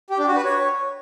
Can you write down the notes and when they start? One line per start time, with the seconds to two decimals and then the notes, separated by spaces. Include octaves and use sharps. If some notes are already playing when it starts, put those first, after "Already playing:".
0.10 G4
0.19 D4
0.27 F#4
0.36 B4
0.45 C#5